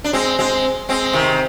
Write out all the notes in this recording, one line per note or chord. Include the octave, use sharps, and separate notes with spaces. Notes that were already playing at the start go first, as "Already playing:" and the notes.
D4
G#3 C4
G#3 C4
G#3 C4
C3 D#3